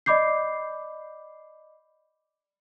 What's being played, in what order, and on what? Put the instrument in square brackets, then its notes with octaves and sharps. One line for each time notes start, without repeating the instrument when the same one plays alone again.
[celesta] D5 D#5 B5 D6 G6 C7